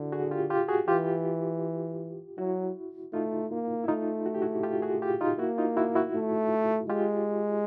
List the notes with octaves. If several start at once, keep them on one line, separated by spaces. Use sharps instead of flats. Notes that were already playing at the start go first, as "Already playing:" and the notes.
Already playing: D3 E4 F#4
F#4 G#4
F4 G4
F4 G4
F#4 G#4
E3 F4 G4
F#3 E4 F#4
A3 D#4 F4
A#3
E4
A3 D#4 F4
F#4
G4
E4 F#4
F4 G4
F#4 G#4
F4 G4
D#4 F4
A#3 E4 F#4
D#4 F4
E4 F#4
E4 F#4
A3
G#3 F4 G4